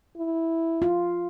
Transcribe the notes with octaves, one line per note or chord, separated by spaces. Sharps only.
E4
F4